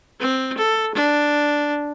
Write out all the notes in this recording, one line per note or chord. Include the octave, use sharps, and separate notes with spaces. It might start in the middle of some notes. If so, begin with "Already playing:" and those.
C4
A4
D4